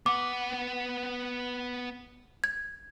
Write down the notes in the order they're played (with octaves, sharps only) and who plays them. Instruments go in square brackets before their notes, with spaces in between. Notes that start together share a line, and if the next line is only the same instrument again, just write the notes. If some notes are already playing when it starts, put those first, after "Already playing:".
[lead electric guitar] B3 F#5 [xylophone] D6
[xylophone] G#6